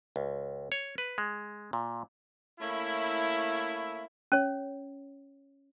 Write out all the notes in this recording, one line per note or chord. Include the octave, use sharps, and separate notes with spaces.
C#2
C#5
B4
G#3
A#2
A3 A#3 C#4 E4
C#4 C#5